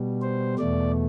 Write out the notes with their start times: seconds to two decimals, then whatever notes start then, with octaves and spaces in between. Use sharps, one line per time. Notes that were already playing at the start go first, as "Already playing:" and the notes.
Already playing: B2 G3
0.22 C5
0.58 E2 B2 A3 D5